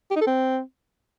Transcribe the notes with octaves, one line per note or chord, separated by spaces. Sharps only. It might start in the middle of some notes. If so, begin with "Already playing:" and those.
G4
D#4
A4
C4